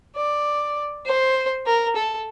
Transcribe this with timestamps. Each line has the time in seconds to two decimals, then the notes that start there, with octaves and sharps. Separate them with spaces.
0.16 D5
1.06 C5
1.66 A#4
1.96 A4